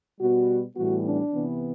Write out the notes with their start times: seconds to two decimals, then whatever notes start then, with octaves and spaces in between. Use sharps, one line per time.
0.19 B2 G3 B3 F#4
0.75 A2 E3 G3 B3 F#4
1.04 D4
1.32 C3 E3 B3